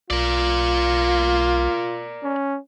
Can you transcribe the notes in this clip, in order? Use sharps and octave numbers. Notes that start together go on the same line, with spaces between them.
B1 F4 A#4 D5
C#4